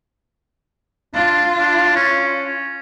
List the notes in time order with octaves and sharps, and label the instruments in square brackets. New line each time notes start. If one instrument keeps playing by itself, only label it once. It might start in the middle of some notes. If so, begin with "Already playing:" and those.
[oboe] D4 [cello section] F4
[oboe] D4
C#4